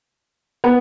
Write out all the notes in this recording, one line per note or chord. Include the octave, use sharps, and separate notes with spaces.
B3